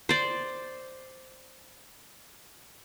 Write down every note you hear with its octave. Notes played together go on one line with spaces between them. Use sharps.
C5 D5